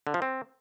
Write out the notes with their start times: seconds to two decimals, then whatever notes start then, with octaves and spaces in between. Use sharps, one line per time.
0.07 D3
0.14 F3
0.22 C4